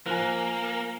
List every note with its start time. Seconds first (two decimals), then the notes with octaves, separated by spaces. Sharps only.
0.06 F3 A#3 A#4 G#5 F#6